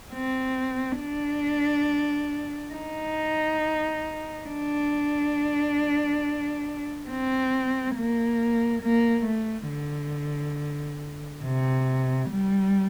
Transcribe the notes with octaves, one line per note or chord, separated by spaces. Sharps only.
C4
D4
D#4
D4
C4
A#3
A#3
A3
D3
C3
G3